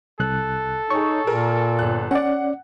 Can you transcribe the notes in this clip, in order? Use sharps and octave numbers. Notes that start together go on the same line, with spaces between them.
C2 A4 F#6
D#4 G#4 C#5 C#6
A#2 G#4 A#4
G1 F#6
C#4 D5 F#5